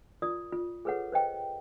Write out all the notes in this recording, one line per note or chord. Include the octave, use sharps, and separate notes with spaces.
F4 A#4 D5 D#6
F4
G#4 A4 B4 C#5 F#5
B4 C5 D#5 G5